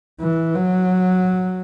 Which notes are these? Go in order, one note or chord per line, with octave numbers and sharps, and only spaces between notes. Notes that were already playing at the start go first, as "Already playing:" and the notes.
E3
F#3